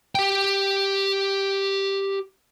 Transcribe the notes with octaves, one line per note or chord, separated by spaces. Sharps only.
G4 G5